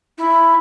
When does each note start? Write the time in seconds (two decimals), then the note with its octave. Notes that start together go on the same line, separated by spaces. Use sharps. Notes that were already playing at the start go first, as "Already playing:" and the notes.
0.18 E4